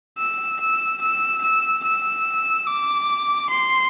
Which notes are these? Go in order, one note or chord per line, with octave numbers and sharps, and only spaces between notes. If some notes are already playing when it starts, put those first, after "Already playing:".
E6
E6
E6
E6
E6
D6
C6